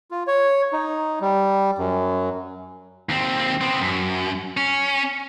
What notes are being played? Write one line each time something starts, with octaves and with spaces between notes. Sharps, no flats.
F4
C#5
D#4
G3
F#2
D#2 C4
B3 C4
F#2
C#4